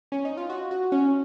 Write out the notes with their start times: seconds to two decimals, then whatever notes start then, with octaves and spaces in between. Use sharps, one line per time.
0.12 C#4
0.25 D#4
0.37 F4
0.50 F#4
0.71 F#4
0.92 C#4